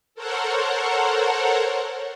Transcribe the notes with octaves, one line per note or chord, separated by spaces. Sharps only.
A4 A#4 C5 C#5 F#5